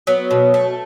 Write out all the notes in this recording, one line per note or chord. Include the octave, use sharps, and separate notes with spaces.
F#3 B3
B2
A3